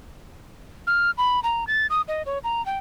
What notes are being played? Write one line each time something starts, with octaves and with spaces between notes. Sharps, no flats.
F6
B5
A#5
A6
D#6
D#5
C#5
A#5
G5